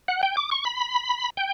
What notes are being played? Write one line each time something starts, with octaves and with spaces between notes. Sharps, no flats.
F#5
G5
D6
C#6
B5
G5